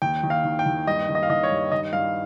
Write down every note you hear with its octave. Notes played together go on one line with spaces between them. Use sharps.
D#2 G5
D#2
F5
D#3
G5
D#2
G2 D#5
D#3
D#5
F5
D#3 D#5
C#5
G2
D#3 D#5
G2 F5